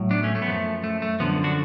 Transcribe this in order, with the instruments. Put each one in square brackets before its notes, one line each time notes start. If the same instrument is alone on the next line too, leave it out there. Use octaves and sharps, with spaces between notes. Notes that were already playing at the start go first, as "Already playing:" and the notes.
Already playing: [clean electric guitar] A2 F#3
B3 D4
A3 C#4
A3
B3
F#2 F3 A3
A3
A3
F#2 D3 F3 B3
D4 F#4